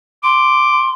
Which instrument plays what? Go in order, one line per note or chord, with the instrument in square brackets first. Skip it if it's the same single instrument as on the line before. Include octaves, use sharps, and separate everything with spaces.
[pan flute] C6 [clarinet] D6